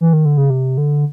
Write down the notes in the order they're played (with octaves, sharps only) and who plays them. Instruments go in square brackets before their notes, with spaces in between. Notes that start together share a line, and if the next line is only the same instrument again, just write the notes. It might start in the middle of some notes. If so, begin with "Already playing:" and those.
[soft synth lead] E3
D#3
D3
C#3
C3
D3